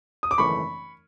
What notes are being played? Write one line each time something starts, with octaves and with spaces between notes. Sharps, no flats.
D#6
D6
G#1 F#2 C#3 E3 A3 B5 C#6